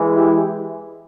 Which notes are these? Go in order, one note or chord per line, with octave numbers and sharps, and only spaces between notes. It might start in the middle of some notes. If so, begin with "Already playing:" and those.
Already playing: E3 G#3
E4 G4